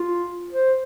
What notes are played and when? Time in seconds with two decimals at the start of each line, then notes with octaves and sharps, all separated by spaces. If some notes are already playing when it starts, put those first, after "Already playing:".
Already playing: F4
0.52 C5